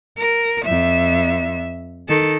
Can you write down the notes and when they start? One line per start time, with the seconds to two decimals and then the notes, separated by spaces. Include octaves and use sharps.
0.17 A#4
0.65 F2 E5
2.08 D#3 A4